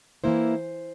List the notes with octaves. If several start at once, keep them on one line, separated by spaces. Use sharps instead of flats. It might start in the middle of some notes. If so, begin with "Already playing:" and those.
E3 A#3 E4 C5